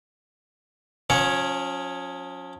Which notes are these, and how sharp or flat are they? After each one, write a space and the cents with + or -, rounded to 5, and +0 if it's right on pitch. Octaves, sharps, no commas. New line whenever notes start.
F3 +45 C#4 +0 C#5 +0